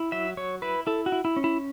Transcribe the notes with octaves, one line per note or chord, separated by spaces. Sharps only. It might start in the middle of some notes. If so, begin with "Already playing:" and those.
Already playing: E4
F#3 E5
F#3 C#5
E4 B4
E4 A4
F#4
E4
E4
C#4
E4